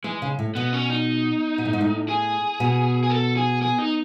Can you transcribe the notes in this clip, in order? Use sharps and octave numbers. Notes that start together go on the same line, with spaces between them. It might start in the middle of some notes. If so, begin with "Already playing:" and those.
E3 G#3
C#3
A2
B2 B3
C#4
D#4
B2
A2
G#2
A2
G#4
B2
G#4
A4
G#4
G#4
D#4